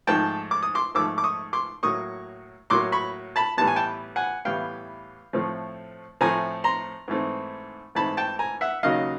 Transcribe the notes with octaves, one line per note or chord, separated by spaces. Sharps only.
G#2 F3 A3 G5 A5
D6
D#6
C6 D6
G#2 F3 A3 D6 E6
D6
C#6 D#6
C6 D6
A2 F#3 A#3 C#6 D#6
A2 F#3 A#3 C6 D6
B5 C#6
A5 B5
A2 E3 G3 B3 A5
G#5
G5 A5
F#5 G#5
A2 E3 G3 B3 F5 G5
A2 F3 A3 C4
A2 F3 A3 C4 G#5 A#5
A#5 C6
G#2 E3 A3 C4
G#2 E3 A3 C4 A5 B5
G5 A5
G#5 A#5
E5 F#5
D#2 C#3 F#3 A#3 D#5 F5